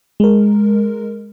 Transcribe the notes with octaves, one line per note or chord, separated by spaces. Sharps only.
G#3 A#4